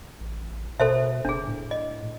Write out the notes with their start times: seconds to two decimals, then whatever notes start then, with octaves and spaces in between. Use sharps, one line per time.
0.20 A1
0.80 B2 A4 C5 E5
1.25 F#1 D4 G#4
1.47 A2
1.71 D#5